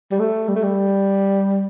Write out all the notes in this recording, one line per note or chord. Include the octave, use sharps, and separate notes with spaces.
G3
A3
G3
A3
G3